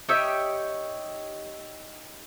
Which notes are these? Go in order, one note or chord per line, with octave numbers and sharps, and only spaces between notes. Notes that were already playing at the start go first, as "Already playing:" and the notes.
D#4 G4 C#5 E5